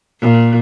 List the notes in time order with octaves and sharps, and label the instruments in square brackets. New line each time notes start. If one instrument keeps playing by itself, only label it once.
[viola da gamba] A#2